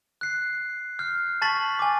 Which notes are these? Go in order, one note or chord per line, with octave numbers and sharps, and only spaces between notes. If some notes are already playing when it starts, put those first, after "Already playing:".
F#6 C7
F6 G6 C7
A5 C#6 A6 B6 F#7
G#5 D6